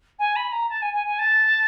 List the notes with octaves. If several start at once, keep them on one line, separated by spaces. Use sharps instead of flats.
G#5
B5
A#5
A5
G#5
G#5
G#5
A5